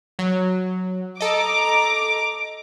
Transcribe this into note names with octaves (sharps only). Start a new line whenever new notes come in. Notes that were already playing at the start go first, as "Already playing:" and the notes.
F#3
A4 D#5 A#5 D6